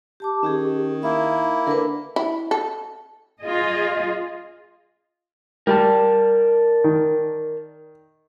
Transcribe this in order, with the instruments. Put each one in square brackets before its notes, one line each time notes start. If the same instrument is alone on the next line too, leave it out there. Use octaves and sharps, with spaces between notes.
[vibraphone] G4 A5 D6
[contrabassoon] D#3 [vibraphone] C#4 G4 G#4
[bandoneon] A#3 E4 [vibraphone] E5
[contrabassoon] D3 [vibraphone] A#4 B4
[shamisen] E4
A4
[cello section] F4 G#4 D#5
[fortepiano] G3 [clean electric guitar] A#4 D5 A5
[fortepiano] D#3